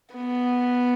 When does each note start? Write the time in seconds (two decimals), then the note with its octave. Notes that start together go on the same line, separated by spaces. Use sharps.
0.15 B3